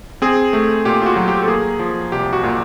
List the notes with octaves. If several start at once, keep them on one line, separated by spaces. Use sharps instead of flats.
C4 G#4
A3
A#2 G4
F4
F#4
F#3
G4
A4
A#3 G#4
F3
C2 G4
F#4
A#2